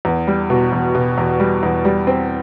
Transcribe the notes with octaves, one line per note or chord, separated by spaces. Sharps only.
E2
G3
B2
E2
B2
E2
G3
E2
G3
C4